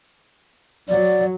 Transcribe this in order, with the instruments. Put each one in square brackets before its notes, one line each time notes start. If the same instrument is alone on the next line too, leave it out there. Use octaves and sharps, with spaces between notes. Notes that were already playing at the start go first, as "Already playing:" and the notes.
[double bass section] F#3 [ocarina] D5